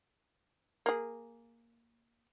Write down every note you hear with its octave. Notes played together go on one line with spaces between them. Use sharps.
A#3 G#4